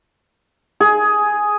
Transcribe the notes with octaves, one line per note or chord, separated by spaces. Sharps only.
G#4